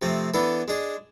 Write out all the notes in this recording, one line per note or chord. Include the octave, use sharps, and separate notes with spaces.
C3 F3 A3 C4
E3 B3 D4 A4
G#3 D4 G#4